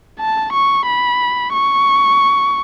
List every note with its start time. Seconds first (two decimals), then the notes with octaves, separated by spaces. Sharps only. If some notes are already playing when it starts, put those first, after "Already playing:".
0.20 A5
0.53 C#6
0.87 B5
1.54 C#6